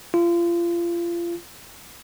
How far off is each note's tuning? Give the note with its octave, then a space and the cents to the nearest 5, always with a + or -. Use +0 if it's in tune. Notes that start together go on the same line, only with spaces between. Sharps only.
F4 -30